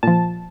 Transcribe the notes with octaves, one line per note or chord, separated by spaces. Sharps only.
A#2 F3 A5